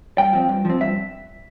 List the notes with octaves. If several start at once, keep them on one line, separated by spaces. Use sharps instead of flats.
G2 G5
F3 C4
G2
F3 C4
G2 E5